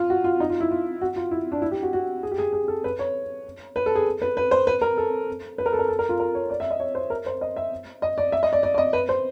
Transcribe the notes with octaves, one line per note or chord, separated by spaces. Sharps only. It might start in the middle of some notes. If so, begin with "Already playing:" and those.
Already playing: F4
F#4
F4
D#4
F4
E4
F4
F#4
F4
E4
D4
E4
G4
F#4
F#4
G#4
G4
G#4
G#4
A4
B4
C#5
B4
A4
G#4
B4
B4
C5
B4
A#4
A4
B4
A#4
A4
A#4
A4
A#4
F4
A#4
C#5
D5
E5
D#5
C#5
C5
A#4
C5
D#5
E5
D#5
D5
E5
D#5
D5
D5
D5
D#5
B4
C5